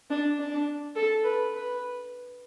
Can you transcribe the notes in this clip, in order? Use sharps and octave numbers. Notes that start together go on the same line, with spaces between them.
D4
D4
A4
B4
B4